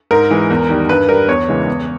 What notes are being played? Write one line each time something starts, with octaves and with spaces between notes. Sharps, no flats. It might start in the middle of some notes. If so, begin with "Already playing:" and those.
G#2 A#4
E3 G#3
E2
D#3 G3
G2 B4
G3 A#4
E2 C#5
C#3 E3 G#3
E2